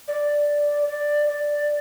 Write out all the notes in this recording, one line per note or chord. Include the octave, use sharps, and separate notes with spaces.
D5
D5
D5